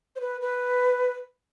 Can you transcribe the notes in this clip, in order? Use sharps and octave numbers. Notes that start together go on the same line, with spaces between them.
C5
B4
B4